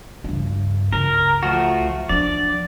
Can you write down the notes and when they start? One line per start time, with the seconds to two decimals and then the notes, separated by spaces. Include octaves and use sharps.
0.24 C#2 G2
0.92 C#2 A#4
1.43 F3 A3 F#4
2.09 F3 D4 D5